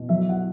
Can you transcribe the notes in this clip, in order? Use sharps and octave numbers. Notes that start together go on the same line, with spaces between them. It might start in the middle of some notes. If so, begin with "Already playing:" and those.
Already playing: B2
F#3 E5
F#5